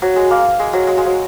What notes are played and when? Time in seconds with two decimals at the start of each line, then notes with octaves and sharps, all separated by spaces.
0.02 F#3
0.16 G#3
0.30 A#3
0.59 G#3
0.73 F#3
0.87 G#3
0.98 G#3
1.06 F#3